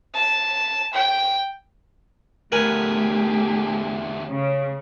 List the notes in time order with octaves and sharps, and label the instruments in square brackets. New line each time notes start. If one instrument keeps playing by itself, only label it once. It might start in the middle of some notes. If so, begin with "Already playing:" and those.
[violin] A5
G5
[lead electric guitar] E2 D3 [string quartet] A3 G4 G#4 [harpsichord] A#4 B4 G#5
[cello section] C#3